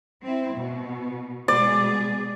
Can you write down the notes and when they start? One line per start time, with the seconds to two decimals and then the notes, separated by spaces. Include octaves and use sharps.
0.24 C4 E4
0.57 B2
1.48 B2 G#3 G#4 D5